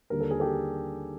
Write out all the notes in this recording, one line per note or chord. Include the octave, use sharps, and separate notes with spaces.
D#2 D3 G3 A#4
A4
G#4
G4 A4